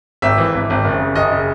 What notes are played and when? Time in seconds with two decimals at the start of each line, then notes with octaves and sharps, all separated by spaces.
0.22 G#1 E5
0.38 E3
0.54 G#1
0.70 G#1
0.85 F#1
1.00 C#3
1.16 F#1 D#5
1.31 C#3